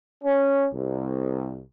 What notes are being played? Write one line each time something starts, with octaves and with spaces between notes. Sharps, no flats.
C#4
C2